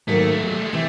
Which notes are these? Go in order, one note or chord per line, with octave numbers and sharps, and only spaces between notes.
G#2 D#3 F#3 A3 A#3
F3
F#3
G3
G#3
C3 E3 A3